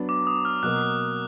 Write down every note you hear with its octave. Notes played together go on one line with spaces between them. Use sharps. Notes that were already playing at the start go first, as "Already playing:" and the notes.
Already playing: F#3 B3 D4
D6
D#6
F6
B2 F#3 A#3 F#6